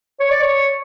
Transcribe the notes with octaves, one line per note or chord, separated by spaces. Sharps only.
C#5
D5
C#5